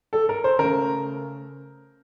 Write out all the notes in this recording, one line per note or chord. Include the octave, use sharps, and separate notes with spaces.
A4
A#4
C5
C#3 A3 A#4